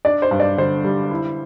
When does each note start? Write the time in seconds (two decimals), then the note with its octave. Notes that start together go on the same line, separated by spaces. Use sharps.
0.05 D4 D5
0.22 C5
0.31 G2
0.40 D5
0.57 D3 C5
0.84 G3
1.11 E4